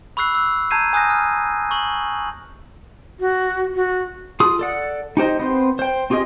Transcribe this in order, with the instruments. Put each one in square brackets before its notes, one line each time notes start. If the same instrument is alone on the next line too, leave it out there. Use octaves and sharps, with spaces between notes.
[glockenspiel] B5 C#6 E6 F#6 C7
E6 F#6
A5 A#5 G6 G#6 C7 D#7
G#5 D#6 F#6 G6 A#6
F6
C#6 F#7
[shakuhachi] F#4
F#4
[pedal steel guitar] F4 G#4 D#6
A4 D5 F#5
D#4 G4 C5 D#5
B3 C4 C5
C5 G5
C4 F4 G4 G#4 D#5